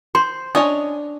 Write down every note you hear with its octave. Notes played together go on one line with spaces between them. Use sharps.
C5 C6
C#4 D4 C#5 D#5